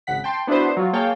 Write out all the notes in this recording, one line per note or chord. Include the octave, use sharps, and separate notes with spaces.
G#1 C#3 F#5 B6
G5 A5 C6
B3 D4 E4 F#4 B4 C5
F#3 F4
A#3 G#4 C#5 F5 G5 A5